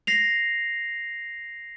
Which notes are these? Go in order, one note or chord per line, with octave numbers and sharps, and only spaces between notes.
A#6 C7 F7